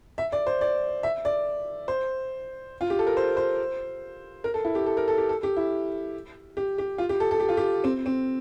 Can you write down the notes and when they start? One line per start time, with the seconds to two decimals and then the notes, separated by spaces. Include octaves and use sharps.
0.18 E5
0.32 D5
0.47 C5
0.61 D5
1.03 E5
1.25 D5
1.88 C5
2.81 F4
2.90 G4
2.99 A4
3.07 A#4
3.17 C5
3.37 C5
4.44 A#4
4.54 A4
4.65 E4
4.75 G4
4.86 A4
4.97 A#4
5.08 A4
5.18 G4
5.29 A4
5.43 G4
5.57 E4
6.57 G4
6.78 G4
6.98 F4
7.09 G4
7.20 A4
7.31 A4
7.40 G4
7.49 F4
7.57 G4
7.84 C4
8.06 C4